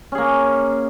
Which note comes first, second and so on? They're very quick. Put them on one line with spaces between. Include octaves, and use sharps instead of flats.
C#4 G#4 A#3